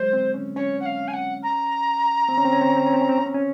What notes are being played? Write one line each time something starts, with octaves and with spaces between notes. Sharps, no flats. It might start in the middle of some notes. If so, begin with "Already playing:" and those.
Already playing: F#3 G#3 C5
C4
C#4
C#4 C#5
F#5
F5
G#5
F#5
A#5
C4
C#4
C4
C#4
C4
C#4
C4
C#4
C4
C#4
C4
C#4
C4
C#4